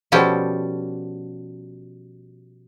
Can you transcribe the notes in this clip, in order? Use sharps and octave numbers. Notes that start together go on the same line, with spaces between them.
B2 F3 G3 C#4 G4 A4